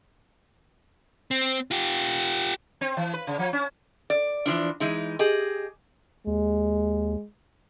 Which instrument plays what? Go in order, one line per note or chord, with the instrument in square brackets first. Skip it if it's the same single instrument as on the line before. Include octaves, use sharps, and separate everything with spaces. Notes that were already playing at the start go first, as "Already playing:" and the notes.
[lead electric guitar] C4
F4 G4
[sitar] C4
E3
B4
C#3
F3
C#4
[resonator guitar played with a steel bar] D5
E3 F3 D4
E3 G#3 D#4
G4 G#4 D#5
[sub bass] D#2 [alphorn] G#3